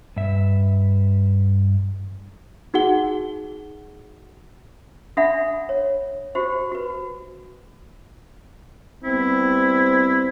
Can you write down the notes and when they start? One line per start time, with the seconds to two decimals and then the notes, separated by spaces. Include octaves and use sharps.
0.16 G2 E5
2.74 D#4 F#4 G#4 F#5 G7
5.17 D4 A4 E5 F#5 B5
5.69 C#5
6.35 F#4 G4 C5
6.72 F#4 B4
9.04 G3 B3 C4 E4